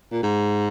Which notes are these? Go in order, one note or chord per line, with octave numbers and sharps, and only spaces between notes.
A#2
G#2